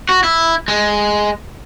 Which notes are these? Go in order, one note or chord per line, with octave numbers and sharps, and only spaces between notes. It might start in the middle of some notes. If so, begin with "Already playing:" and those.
F#4
E4
G#3